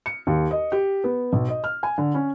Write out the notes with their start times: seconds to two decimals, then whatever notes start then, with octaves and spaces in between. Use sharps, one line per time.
0.06 C#7
0.27 D#2
0.51 D#5
0.72 G4
1.04 B3
1.33 B1
1.48 D#5
1.64 F6
1.83 G#5
1.98 D3
2.14 C#4